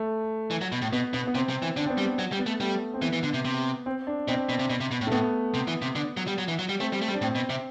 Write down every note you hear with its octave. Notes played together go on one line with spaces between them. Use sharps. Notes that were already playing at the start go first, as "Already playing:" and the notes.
Already playing: A3
E3
F#3
B2
A2
B2 B3
B2 B3
B3
C3 C4
C3
E3
D3 D4
C4
B3
G3
B3
F#3 B3
G3
B3
A3
G3 A3
C4
E3 B3
E3
D3
C3
C3
C4
D4
B2 C4
B2
C3
B2
C3
B2
A2
A3
A2 B3
C3
E3
C3
D3
F#3
G3
F#3
E3
F#3
G3
A3 C4
G3
A3
G3
D4
A2 C4
B2
C3